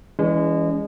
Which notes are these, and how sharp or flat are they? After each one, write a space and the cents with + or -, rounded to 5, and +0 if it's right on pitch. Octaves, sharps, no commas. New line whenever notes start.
E3 +0 G#3 -25 C#4 +30